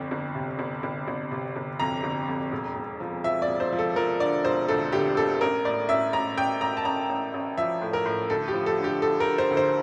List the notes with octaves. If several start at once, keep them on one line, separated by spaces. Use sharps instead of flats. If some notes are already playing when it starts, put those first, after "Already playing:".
Already playing: G1 F2
G1
C3
G1
G1
G1
C3
G1
F2 A#5
G1
F2
E1
E1
F3
F3 E5
D5
E1
C5
F3
A4
F3 A#4
D3 D5
E1 C5
D2 A4
D2 G4
E1 A4
A1 A#4
A2 D5
A1 E5
A1 A#5
A1 G5
A1 A#5
A5
A1 A#5
A1
A1
F3 E5
A2
A#4
A2
D2 A4
G4
F3
A4
D3
G4
D3 A4
A#4
D3
C5
D2
C5